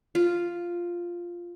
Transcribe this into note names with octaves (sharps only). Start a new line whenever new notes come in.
F4